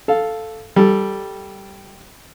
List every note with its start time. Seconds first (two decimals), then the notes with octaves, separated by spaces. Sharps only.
0.08 A4 F5
0.76 G3 A4